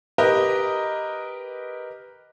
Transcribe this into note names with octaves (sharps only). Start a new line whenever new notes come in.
G4 A#4 B4 D#5